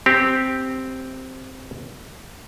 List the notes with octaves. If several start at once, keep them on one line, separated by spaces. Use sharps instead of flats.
C4 G4